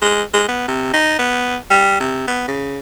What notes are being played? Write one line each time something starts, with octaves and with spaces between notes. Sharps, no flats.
G#3
G#3
B3
C3
D#4
B3
G3
C3
B3
C#3